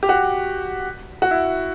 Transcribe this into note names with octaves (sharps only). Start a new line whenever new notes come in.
G4
F#4
F#4
E4